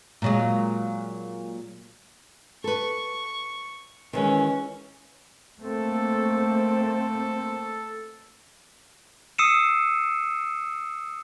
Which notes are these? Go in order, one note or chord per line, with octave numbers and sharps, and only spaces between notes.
A#2 F#3 G#3
A4 B4 C#6
D#3 E3 G#3 C#4
A3 A#3 C4 A4
D#6 E6 C7 C#7 D#7 E7